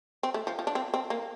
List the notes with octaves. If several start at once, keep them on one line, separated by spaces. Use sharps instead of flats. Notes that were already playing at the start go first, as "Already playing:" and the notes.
C4
A3
F3
F3
D4
C4
C4
A#3